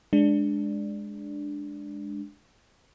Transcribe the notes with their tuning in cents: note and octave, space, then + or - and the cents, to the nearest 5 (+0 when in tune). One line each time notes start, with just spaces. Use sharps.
G#3 +0 D4 +0